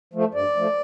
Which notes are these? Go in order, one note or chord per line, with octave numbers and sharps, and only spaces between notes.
F3 A3
G2 D5
F3 A3